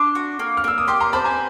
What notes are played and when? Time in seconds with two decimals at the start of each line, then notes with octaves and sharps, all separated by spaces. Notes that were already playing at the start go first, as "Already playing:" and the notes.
Already playing: D4 C6 D6
0.15 F#4
0.39 A#3
0.57 F6
0.64 A#3 E6
0.78 D#6
0.88 G4 C6 D6
1.00 A#5 C6
1.13 C5 A5 B5
1.24 G#5 A#5